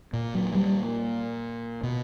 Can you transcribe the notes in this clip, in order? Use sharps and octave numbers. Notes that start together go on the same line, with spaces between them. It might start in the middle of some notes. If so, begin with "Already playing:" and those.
A#2
F#3
G3
B2